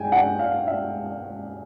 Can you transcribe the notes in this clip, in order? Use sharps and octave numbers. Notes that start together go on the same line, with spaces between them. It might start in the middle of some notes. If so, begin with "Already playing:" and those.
Already playing: G#3 G5 G#5
F#5
F5
E5